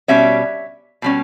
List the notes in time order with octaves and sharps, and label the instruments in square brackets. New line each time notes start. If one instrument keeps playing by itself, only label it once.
[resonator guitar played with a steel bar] B2 G3 C#4 C#5 E5
B2 G3 C#4